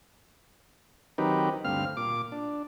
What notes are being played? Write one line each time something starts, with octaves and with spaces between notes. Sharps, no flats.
D#3 F#3 C4 D#4 G4 B4
D2 G2 C4 F5 F6
A#2 D6
D4